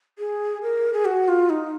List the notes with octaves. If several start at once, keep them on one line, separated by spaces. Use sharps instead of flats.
G#4
A#4
G#4
F#4
F4
D#4